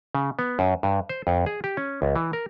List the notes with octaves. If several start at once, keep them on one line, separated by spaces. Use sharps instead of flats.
C#3
B3
F#2
G2
C5
F2
G#4
G4
C#4
C#2
E3
A#4